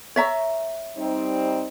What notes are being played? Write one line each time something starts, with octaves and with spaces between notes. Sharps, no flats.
C#5 E5 A#5
G3 C4 D#4